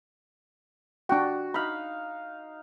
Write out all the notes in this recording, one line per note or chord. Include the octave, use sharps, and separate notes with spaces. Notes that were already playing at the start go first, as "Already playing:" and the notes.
D4 F#4 G5
D#4 F5 B5